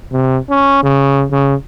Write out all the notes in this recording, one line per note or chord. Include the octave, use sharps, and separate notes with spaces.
C3
C#4
C#3
C#3